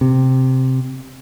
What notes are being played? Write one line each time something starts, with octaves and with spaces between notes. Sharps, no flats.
C3